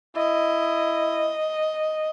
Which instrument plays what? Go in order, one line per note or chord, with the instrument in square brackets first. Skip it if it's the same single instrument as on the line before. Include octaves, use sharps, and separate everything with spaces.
[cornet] E4 [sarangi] D#5